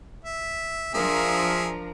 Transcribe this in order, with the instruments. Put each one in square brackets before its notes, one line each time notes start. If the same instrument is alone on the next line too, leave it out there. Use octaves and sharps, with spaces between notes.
[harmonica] E5
[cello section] F3 D4 A#4 [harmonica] G#4 E5